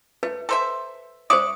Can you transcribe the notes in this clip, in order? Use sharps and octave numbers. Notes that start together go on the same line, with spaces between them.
A3 B4
A4 C5 E5
C5 D5 E5 C#6 D#6